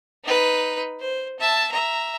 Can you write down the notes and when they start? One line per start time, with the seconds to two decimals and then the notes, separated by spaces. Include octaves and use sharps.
0.24 D#4 B4
1.01 C5
1.40 E5 A5
1.71 E5 A#5